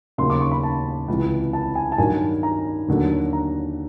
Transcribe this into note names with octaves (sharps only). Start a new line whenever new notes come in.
D#2 C#3 F#3 C6
D6
C#6
B5
A5
C#2 C3 E3
A5
G#5
A5
G2 D#3 F#3 G#5
A#5
D#2 D3 F#3
A#5